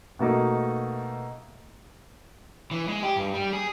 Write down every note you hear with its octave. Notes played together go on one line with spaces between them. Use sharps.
B2 A3 A#3 D#4
E3
G#3
G4
G2
G3
G#4